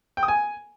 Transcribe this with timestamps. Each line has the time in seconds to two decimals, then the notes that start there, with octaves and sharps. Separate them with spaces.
0.17 G5
0.23 D#6
0.28 G#5